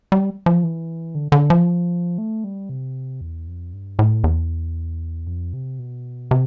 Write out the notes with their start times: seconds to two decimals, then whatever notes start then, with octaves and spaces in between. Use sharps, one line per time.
0.12 G3
0.46 F3
0.63 E3
1.15 D3
1.32 D3
1.50 F3
2.18 A3
2.44 G3
2.69 C3
3.21 E2
3.47 F2
3.73 G2
3.99 A2
4.24 E2
5.27 F2
5.53 C3
5.79 B2
6.31 C3